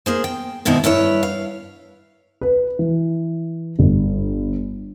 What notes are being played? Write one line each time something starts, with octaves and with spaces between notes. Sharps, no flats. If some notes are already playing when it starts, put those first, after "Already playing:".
A#3 G#4 C5
G5
G2 B2 D#3 G#3 C4 E4
G2 E4 B4 C#5
F5
B4
E3
G1